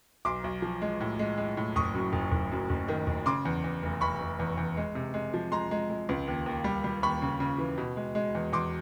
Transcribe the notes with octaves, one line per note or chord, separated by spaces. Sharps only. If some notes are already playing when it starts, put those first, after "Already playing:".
B1 C6 D6
B1
F3
G#3
A2
G#3
G#3
A2
F#1 C#6 D#6
F#2
F#1
F#1
F#2
F#1
D#3
F#1
C#3 C6 D6
E2
E2
F1
F1 B5 C#6
F1
E2
E2
G#3
C3
G#3
F3
G#3 A#5 C6
G#3
G#3
C#2
D#2
D#2
G3
G3
D#2 B5 C#6
C#3
C#3
E3
B2
G#3
G#3
E2
E2 C6 D6